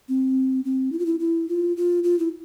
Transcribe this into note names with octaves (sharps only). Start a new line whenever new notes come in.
C4
C4
E4
F4
E4
E4
F4
F4
F4
E4